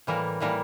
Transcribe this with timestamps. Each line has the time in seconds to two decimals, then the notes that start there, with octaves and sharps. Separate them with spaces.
0.07 A2 E3 G3 A#3
0.40 A2 E3 G3 A#3